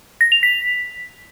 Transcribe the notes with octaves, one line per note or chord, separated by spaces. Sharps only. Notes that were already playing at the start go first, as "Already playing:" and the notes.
A#6
F7
B6